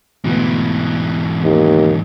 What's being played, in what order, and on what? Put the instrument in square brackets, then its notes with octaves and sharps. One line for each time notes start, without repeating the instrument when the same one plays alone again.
[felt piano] D2 B2 B3 [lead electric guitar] G#2 E3
[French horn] D#2